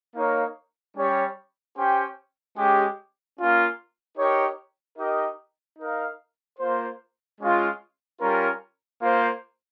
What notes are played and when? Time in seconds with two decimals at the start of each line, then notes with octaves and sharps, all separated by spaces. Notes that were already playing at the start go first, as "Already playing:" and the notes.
0.15 A#3 D#4 A#4 C#5 F5
0.96 G3 C#4 G4 C#5
1.76 C#4 G4 C5 G5
2.56 G#3 C#4 G4
3.37 A#3 C#4 F4
4.17 D#4 G4 A#4 C#5
4.98 D#4 G4 A#4 D#5
5.79 D#4 A#4 F5
6.59 A#3 F4 C5
7.40 G#3 C#4 F4
8.20 G3 C#4 F4 A#4
9.00 A#3 F4 C5